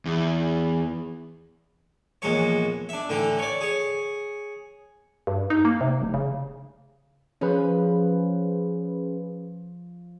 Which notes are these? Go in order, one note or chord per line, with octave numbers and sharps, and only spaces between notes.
E2
A#1 E2 G#3 C#5
D4 E5
A2 D3 E3 G5
C#5 D5
G#4 C#5
G2
D#4
A#3
C3
F1
C#3
F3 C#4 G#4 B4